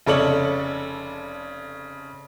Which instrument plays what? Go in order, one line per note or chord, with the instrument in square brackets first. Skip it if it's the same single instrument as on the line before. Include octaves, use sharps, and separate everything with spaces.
[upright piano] F1 C#3 A4 C#5 D5 F#7